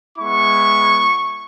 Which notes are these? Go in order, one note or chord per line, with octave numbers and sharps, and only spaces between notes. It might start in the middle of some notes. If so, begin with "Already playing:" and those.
G#3 B3 E4 C#6